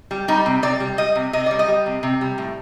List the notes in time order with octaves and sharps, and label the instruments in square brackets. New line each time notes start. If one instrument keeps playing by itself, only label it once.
[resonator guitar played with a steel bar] G3
G3 D#4
C3
C3 D5
G3
G3 D#5
C3
C3 D#5
G3 D5
D#5
G3
C3
C3
G3
A2